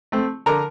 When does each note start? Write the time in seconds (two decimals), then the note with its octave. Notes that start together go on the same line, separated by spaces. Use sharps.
0.12 A3 C4
0.46 D3 A#4 A#5